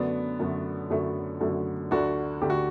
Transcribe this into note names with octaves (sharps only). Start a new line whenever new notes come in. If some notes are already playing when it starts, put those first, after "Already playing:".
Already playing: F#2 D3 F#3 A3 B3 D4
F#2 D3 F#3 A3
F#2 D3 F#3 A3
F#2 D3 F#3 A3
D2 D3 A3 D4 F#4
D2 D3 A3 G4
F#4